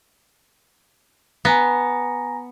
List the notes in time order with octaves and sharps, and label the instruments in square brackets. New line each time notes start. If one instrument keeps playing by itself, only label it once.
[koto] B3 [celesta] G#5 A#5 A#6